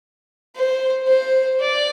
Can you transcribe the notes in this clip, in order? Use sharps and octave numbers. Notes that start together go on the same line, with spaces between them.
C5
C5
D5